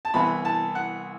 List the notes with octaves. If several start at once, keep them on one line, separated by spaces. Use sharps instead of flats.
A5
C2 C3 E3 B3 B5
A5
F#5